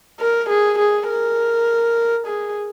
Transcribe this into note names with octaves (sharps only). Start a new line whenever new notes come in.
A#4
G#4
G#4
A#4
G#4